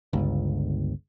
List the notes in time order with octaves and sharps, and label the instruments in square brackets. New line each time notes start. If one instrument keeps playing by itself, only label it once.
[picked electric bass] G1 C#2